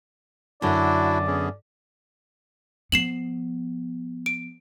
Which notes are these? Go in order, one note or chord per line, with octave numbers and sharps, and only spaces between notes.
F#2 D3 D4 E4 F#4 D5
B3 C#4 G#4
F3 B3 C7 E7 F#7
D7